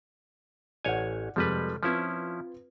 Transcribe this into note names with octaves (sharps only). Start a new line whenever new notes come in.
A1 C#5 D5 F#5 G#5
F2 C3 F3 G3 G#3 B4
F3 C4 C#4 E4 F4 B4